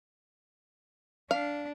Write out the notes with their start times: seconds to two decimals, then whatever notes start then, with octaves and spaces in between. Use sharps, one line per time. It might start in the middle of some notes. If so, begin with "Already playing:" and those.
1.31 D4 F5